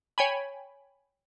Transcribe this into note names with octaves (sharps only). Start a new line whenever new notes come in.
C#5 G5 G#5 B5